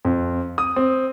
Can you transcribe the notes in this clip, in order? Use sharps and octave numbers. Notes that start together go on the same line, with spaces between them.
F2
D#6
C4